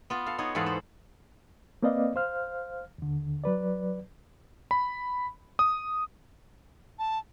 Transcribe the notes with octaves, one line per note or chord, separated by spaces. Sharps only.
B3 F4
A4 F5
B3 D#4 C#5
E2 G#2 B3 A4 F5 F#5
C5
A#3 C4 B4 D5 D#5 F5
C5 F5 F6
D#2 D3
F#3 B4 D5
B5
D#6
A5